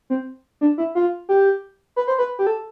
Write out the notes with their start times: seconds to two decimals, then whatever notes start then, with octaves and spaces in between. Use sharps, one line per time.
0.10 C4
0.61 D4
0.78 E4
0.95 F4
1.29 G4
1.96 B4
2.08 C5
2.18 B4
2.39 G4
2.47 A4